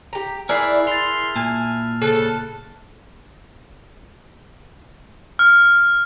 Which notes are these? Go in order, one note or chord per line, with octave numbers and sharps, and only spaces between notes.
G4 A#5
E3 D4 E4 G#4 A#4 E6 F#6 C7
E4 C6 A6 F7
A#2 G#5 A5 F6
C#3 F3 A4 A5 F#6
F6